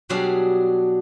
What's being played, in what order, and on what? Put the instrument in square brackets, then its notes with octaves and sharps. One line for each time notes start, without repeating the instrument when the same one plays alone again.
[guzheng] B2 F#3 G3 D4 G#4 F5